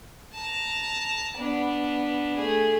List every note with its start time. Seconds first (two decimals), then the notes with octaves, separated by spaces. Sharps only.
0.34 A5 A#5
1.38 B3 D4
2.37 A3 G#4